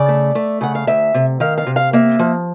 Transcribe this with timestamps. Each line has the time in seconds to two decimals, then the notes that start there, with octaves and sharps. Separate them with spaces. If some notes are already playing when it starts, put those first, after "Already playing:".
Already playing: C#3 D5
0.08 A3
0.35 A3
0.61 C#3 F#5
0.75 F5
0.87 D2 E5
1.14 C3
1.40 D#3 F5
1.58 F5
1.66 C3
1.76 F5
1.93 A#3 E5
2.19 F3